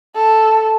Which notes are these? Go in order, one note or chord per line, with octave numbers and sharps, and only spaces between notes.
A4